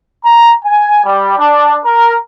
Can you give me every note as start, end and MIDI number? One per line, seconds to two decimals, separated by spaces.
0.24 0.51 82
0.64 1.01 80
1.05 1.33 55
1.39 1.78 62
1.84 2.14 70